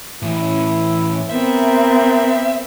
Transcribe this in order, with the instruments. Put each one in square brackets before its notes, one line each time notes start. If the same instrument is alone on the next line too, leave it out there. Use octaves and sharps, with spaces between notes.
[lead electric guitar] A2 E3 [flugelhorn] E4
[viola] B3 C4 [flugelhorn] A#4 [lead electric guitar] E5